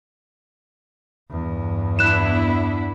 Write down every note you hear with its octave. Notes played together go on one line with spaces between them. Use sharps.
E2 G2
B3 D4 E4 F#6 E7